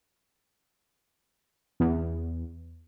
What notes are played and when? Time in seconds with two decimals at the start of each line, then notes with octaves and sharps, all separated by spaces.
1.80 E2